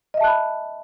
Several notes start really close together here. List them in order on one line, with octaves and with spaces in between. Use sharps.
D#5 E5 A5 F#6 B5